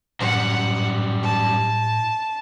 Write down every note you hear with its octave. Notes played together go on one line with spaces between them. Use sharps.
F#2 A2 G3 F#5
A5